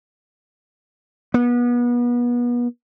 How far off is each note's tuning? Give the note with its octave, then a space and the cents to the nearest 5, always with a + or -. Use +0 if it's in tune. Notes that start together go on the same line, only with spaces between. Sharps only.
B3 -30